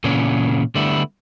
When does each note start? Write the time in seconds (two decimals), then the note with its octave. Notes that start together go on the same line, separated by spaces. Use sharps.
0.04 A#2 C#3 E3 B3 C#4 D4
0.75 D3 G3 A3 B3 E4